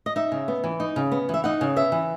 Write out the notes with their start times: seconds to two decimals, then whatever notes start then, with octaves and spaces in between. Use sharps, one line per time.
0.06 D#5
0.16 D#4 E5
0.32 C#3
0.48 B3
0.64 E3
0.80 D#4
0.96 C#3
1.12 B3
1.29 E3 E5
1.44 D#4 F#5
1.61 C#3
1.76 B3 E5
1.92 E3